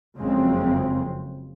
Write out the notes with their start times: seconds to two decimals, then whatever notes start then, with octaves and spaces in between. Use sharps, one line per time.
0.18 F#1 F2 C#3 G#3 C4